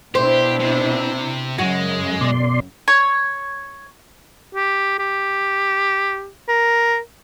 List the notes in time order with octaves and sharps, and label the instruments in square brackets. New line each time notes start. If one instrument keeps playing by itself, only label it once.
[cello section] B2 D4 E4 [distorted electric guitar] G4 [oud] C5
[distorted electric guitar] C3
[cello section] F#2 C#3 [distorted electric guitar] G#3 [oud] F#4
[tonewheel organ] B2 D5 C6
[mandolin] C#5
[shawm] G4
G4
A#4